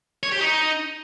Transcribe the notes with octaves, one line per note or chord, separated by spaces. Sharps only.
C#5
G4
D#4